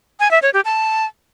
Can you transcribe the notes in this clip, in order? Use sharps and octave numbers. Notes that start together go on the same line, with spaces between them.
G#5
E5
C#5
G4
A5